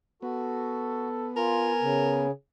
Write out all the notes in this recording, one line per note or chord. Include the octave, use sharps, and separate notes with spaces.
B3 F#4 A4
F4 A#4 G#5
C#3